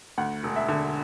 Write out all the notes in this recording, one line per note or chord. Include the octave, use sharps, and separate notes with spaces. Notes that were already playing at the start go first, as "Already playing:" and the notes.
D2 F#5
E1
E5
D3